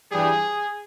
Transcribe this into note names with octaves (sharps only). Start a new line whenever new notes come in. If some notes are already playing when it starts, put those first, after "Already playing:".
G2 E3 G3 G#4